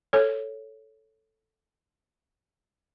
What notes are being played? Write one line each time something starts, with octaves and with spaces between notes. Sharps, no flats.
A4 C#5